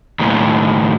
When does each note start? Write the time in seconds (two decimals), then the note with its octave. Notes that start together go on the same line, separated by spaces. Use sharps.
0.19 D#2 A2